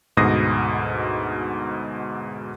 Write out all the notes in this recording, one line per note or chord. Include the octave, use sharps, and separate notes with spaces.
D2 G#2 B2 D#6 A#6 C7